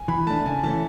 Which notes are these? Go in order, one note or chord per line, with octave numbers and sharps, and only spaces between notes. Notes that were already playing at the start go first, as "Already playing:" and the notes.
Already playing: G#5
E3 B5
A3 D4 A5
C#3 G#5
E3 A3 C#4 A5